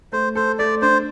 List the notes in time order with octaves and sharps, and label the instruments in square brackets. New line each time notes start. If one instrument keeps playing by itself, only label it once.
[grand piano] A3 [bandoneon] C5
[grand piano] A4 [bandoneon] C5
[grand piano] A3 [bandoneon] D5
[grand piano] D4 [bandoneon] C5